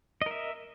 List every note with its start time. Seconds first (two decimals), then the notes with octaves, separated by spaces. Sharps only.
0.22 D#5
0.26 A#4
0.31 E5